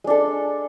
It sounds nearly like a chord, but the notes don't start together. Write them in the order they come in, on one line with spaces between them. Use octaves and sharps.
G#3 D4 A4